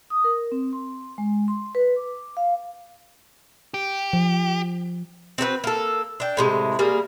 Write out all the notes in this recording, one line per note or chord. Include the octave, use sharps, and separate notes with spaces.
D#6
A#4
C4
C6
G#3
C6
B4
D6
F5
G4
F3
C4 F#4 A4 B4
A#3 A4
D4 G5
A2 C3 G#3
G3 A#3 G#4